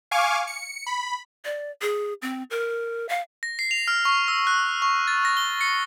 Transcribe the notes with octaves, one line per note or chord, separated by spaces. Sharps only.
F5 G#5 C#6 D6
C#7
B5
D5
G#4
C4
A#4
F5
A#6
C7
F7
F6
C#6
E6
F#6
C#6
A6
A#6
G7
C#7